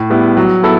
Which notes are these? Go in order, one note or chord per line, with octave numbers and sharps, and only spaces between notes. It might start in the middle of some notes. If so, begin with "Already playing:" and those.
Already playing: A2
G3 B3 E4
F#3
B3 E4 A4